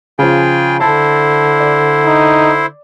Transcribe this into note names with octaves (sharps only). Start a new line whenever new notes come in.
C#3 F3 F4 G#4 G5
D3 E4 C5 A5
D5
D#4